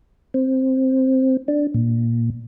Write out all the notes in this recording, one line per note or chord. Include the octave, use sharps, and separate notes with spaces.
C4
D4
A#2